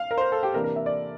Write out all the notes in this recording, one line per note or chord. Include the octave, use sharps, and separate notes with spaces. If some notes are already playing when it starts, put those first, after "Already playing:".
Already playing: F5
A#4
C5
A#4
A4
G4
C3 E3 A#3 D4 A#4
A#4
E5
D5